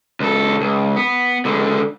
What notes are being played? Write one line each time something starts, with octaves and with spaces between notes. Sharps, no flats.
C#2 A4
C#2
B3
C#2 D3